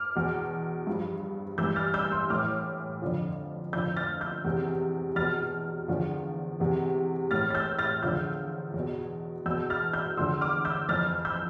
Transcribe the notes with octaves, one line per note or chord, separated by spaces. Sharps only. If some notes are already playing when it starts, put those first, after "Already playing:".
Already playing: D6 F6
E2 B2
G2 F3
G2 E3 E6 G6
F6 A6
E6 G6
C6 E6
A2 E3 D6 F6
F2 D3 F3
F2 D3 F3 E6 G6
F6 A6
E6 G6
E2 C3 E3
E2 B2 F6 A6
E2 D3 F3
E2 C3 E3
A2 E3 F6 A6
A6
E6 G6
F6 A6
E2 D3 F3 E6 G6
E2 B2
E2 B2 E6 G6
F6 A6
E6 G6
E2 D3 F3 C6 E6
D6 F6
E6 G6
F2 E3 F6 A6
E6 G6